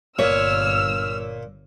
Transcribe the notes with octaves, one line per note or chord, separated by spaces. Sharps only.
G1 A#2 C#5 E6 F6